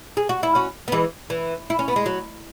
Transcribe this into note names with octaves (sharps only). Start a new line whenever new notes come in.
G#4
F#4
E4
C#4 F#4
B3
E3 G#3
E3
E4
C#4
B3
G#3
F#3